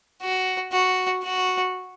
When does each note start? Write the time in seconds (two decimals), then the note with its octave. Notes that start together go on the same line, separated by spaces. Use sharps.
0.23 F#4
0.73 F#4
1.24 F#4